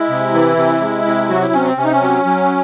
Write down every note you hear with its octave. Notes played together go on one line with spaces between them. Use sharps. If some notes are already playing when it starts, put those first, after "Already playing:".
Already playing: G#3 E4
C3
E3
C3
G#3
C3
F#3 F#4
E4
C3 C#4
C4
C3 C#4
D#4
C#4
F#3
F#3